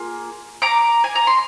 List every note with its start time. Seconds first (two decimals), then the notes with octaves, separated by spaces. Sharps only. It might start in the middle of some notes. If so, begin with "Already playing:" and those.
Already playing: A#3 F4 G#4
0.62 A#5 D6
1.04 G#5
1.15 A#5
1.27 C6